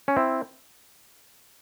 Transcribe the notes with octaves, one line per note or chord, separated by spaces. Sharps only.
C#4
C4 E4